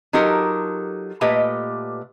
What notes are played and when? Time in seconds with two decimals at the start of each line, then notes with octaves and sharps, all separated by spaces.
0.13 F#3 D#4 F4 G4 A4 A#4
1.21 A#2 A3 G4 B4 D#5